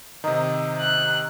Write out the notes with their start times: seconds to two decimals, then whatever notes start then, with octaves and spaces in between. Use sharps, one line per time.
0.24 C3 D#3 D#5 A#5 D#6
0.80 F#6